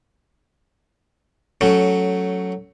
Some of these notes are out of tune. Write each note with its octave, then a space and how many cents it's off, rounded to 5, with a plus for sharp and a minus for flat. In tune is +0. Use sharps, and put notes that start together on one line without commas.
F#3 +0 A3 +0 C#4 +15